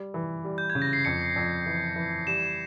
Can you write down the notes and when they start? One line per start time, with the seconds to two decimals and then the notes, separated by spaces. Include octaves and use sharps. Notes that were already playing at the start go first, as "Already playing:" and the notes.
Already playing: G3
0.14 E3
0.44 G3
0.58 G6
0.70 G#6
0.75 C#3
0.82 A#6
0.93 C7
1.05 F2 C#7
1.36 F2
1.66 E3
1.96 E3
2.27 G3 E7